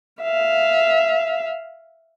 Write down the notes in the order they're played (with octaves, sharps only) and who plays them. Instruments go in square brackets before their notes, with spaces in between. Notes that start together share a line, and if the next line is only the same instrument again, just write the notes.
[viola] E5 F5